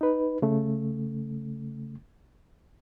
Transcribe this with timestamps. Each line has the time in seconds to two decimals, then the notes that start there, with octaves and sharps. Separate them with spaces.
0.01 D#4 B4
0.42 C#3 A3